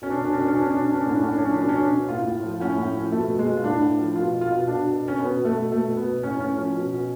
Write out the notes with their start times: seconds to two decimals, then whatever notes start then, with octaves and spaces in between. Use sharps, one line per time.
0.02 B2 C#4
0.10 D4
0.18 B2 C#4
0.25 D4
0.33 C#4
0.36 B2 D4
0.48 C#4
0.54 B2 D4
0.62 C#4
0.70 B2 D4
0.78 C#4
0.85 D4
0.89 B2 C#4
1.01 D4
1.06 A2 C#4
1.15 D4
1.23 A2 C#4
1.31 D4
1.38 F3 C#4
1.45 D4
1.53 C#4
1.57 B2 D4
1.69 C#4
1.75 B2 D4
1.83 C#4
1.92 B2
2.08 A2 F4
2.27 A2
2.43 F3
2.60 A2 C#4
2.78 A2
2.96 F3
3.12 B2 A3
3.30 B2
3.39 G#3
3.46 B2
3.57 F4
3.64 A2 D4
3.81 A2
3.99 F3
4.16 B2 F4
4.33 B2
4.41 F4
4.51 B2
4.68 B2 D4
4.85 B2
5.02 B2
5.08 C#4
5.19 B2 B3
5.36 B2
5.45 A3
5.53 B2
5.71 B2 A3
5.88 B2
5.97 B3
6.05 B2
6.23 A2 C#4
6.40 A2 C#4
6.57 F3 C#4
6.74 B2
6.92 B2